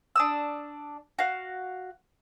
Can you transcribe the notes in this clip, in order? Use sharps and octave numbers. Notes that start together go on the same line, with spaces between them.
D4 D#6 E6
F#4 F5